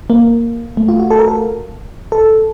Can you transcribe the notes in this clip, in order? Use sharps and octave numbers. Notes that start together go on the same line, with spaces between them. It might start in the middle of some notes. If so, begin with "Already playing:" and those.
A#3
A3
F4
F#4
A4
A#4
A4
A4